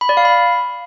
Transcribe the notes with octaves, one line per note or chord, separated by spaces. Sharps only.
B5
D5
F5
B5